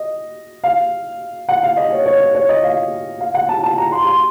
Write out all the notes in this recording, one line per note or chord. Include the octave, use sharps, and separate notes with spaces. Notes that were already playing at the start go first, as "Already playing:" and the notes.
Already playing: D#5
F5
F#5
F5
D#5
C#5
C#5
C#5
C#5
D#5
F5
F5
F#5
A5
A5
A#5
C6
C6